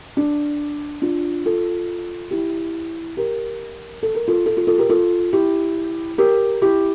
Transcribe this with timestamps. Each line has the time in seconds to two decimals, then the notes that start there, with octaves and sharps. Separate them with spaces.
0.17 D4
1.02 D4 F4
1.45 F4 A4
2.31 E4 G4
3.17 G4 A#4
4.03 A4
4.15 A#4
4.28 F4 A4
4.46 F4 A4
4.57 F4 A4
4.67 F4 A4
4.78 G4 A#4
4.89 F4 A4
5.33 E4 G4
6.18 G4 A#4
6.62 E4 G4